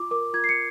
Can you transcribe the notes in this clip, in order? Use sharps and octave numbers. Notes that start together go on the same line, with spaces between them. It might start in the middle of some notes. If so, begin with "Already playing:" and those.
Already playing: F4 D6
A#4 D6
F4 G#6
C7
C#7